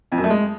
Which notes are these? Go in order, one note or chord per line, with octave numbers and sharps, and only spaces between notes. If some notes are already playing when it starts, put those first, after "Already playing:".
F2
F#2
A3
G#3